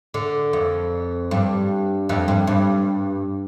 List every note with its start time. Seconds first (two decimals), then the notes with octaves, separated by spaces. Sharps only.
0.14 D3
0.53 F2
1.31 G2
2.09 F2
2.28 G2
2.47 G2